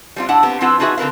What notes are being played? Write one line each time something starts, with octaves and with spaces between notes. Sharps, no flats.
G3 C4 F4
A2 D4 E4 F#5
B3 C4 G4
F3 C4 E4 F4 B4 F#5
D#4 F4 F#4 G#4 B4 E5
D3 C4 A#4 B4 F5